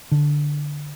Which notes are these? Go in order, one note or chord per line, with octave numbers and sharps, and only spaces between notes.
D3